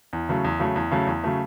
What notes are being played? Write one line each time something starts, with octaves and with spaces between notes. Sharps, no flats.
E2
C#3 F#3 A3
E2
C#3 F#3 A3
E2
C#3 F#3 A3
E2
C#3 F#3 A3